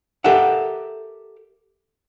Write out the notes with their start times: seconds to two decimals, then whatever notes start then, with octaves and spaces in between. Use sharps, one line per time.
0.24 G4 A4 A#4 E5 F#5